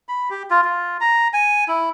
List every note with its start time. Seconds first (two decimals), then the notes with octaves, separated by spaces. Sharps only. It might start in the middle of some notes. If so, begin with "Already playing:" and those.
0.09 B5
0.30 G4
0.51 F4
0.64 F4
1.01 A#5
1.33 G#5
1.68 E4